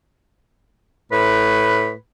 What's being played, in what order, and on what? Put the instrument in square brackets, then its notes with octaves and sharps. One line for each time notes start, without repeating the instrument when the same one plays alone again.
[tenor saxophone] A2 [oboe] B4